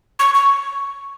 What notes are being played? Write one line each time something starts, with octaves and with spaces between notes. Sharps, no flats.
C#6
C#6